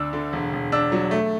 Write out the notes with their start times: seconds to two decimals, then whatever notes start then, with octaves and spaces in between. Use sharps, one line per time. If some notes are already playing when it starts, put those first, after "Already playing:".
Already playing: D2 D4 E6
0.13 D3
0.33 E1
0.53 E1
0.72 D4 E6
0.92 F#3
1.11 A3